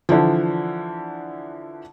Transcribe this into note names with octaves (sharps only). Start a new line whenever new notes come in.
D3 E3 F3